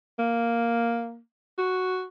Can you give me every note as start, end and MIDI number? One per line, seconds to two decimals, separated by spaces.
0.19 1.19 58
1.58 2.06 66